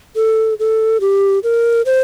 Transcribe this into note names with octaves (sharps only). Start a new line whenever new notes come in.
A4
A4
G4
A#4
C5